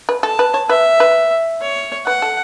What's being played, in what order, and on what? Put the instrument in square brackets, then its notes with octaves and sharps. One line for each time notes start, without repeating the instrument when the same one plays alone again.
[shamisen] B4
[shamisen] A4 [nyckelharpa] A5
[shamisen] B4
C#5
[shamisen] B4 [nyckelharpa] E5
[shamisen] B4
[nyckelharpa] C#5
[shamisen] B4 [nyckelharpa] F#5
[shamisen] A4